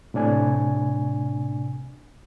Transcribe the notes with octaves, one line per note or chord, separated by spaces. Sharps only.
A2 C3 D4 G#5